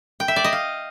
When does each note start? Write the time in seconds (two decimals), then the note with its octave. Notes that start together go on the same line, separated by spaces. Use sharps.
0.20 G5
0.28 E5
0.36 D5
0.44 D#5
0.53 F5